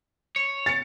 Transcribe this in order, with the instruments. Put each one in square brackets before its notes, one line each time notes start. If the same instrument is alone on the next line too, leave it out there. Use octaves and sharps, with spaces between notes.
[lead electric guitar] C#5
[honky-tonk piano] A6 C#7